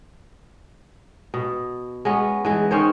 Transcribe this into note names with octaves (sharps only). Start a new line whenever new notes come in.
B2
G#3 B3 C#4
E3 G#3
D#3 C#4 C5 C#5